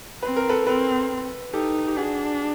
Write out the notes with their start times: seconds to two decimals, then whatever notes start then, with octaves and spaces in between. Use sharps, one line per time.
0.23 C4 B4
0.36 A#4
0.49 A4 B4
0.67 C4 A4 B4
1.53 D#4 G4 A4
1.87 G4
1.97 D4 F#4 G#4